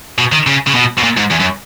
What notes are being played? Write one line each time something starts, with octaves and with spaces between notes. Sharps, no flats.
B2
D#3
C#3
C#3
B2
B2
A#2
G#2
E2
F#2